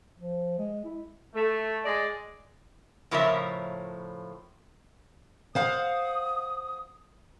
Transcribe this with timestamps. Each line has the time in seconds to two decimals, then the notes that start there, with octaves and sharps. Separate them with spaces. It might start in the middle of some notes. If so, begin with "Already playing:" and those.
0.19 F3
0.58 G#3
0.85 E4
1.34 A3
1.85 G#3 D5
3.11 A2 C#3 F3 A#4 C#5 E5
5.55 C5 F5 F#5 D#6